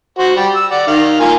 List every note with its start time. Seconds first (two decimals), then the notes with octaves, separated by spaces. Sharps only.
0.19 F#4 C5
0.36 G3
0.55 E6
0.71 D5 F#5
0.87 D#3 F5
1.20 A#3 F4 G#5